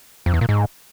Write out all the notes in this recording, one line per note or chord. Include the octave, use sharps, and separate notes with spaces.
F2
E2
A#2
G#2